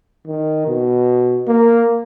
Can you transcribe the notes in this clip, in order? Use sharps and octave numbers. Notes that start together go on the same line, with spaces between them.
D#3
B2
A#3